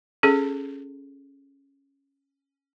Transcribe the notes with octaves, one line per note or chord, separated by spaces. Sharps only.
C#4 G#4 A4